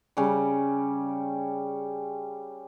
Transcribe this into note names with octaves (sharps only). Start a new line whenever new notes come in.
C#3 G3